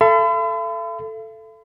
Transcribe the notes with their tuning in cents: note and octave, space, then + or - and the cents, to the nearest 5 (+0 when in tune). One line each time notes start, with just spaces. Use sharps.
A4 +0 E5 +45 B5 +45